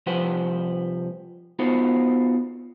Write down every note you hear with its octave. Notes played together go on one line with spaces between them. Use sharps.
C2 F3 G4 B4 C5 F#5
B3 D#4 F4 F#4 A4 C5